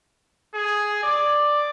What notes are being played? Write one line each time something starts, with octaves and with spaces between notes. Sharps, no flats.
G#4
D5